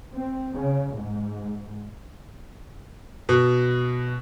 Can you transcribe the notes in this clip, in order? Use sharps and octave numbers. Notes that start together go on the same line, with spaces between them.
C4
C#3
G#2
B2